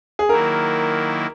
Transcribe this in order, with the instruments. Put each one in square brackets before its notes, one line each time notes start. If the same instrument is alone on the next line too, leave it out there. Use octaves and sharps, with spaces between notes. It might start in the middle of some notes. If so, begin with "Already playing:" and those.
[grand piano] G#4
[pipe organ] D#3 F#3 A#3 E4 [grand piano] A#4